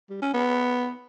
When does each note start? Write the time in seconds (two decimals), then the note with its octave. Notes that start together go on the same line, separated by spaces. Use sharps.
0.10 G3
0.22 C#4
0.33 B3